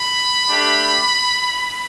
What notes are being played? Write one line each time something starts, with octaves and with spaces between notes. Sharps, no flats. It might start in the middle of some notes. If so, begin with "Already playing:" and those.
Already playing: B5
A3 D4 G4